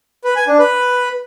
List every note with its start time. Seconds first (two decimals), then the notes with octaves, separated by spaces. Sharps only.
0.24 B4
0.36 G#5
0.47 D4
0.59 B4